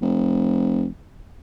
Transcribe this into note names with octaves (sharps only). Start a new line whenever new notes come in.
F1